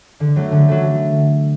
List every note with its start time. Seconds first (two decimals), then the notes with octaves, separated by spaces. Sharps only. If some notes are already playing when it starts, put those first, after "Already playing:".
0.20 D3
0.36 F#3 A3
0.52 D3
0.68 F#3 A3